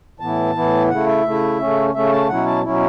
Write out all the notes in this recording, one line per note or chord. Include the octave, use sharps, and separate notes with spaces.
A2 E3 B3 E4 A5
A2 E3 B3 E4
C#3 A3 E4 F#5
E5
C#3 A3 E4
C#3 A3 C#4
C#3 A3 C#4 E5
A5
B2 F#3 C#4 E4 F#5
A5
B2 F#3 C#4 E4